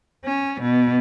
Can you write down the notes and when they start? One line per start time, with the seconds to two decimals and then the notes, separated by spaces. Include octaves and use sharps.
0.25 C#4
0.61 B2